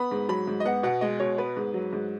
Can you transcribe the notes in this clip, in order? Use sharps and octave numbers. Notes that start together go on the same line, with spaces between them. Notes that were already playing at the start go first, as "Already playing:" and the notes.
Already playing: B3 B5
G#2
F#3 B5
G#2
D#5
B3 F#5
B2 F#5
G#3 D#5
B2 C#5
B3 B4
G#2
F#3
G#2